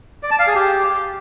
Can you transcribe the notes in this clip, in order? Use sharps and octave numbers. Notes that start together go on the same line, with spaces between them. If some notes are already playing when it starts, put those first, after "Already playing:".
D5
A5
F5
G#4
G4